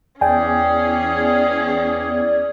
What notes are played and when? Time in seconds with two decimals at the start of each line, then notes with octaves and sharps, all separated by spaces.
0.21 E2 C#4 G#4 D5 G5 G#5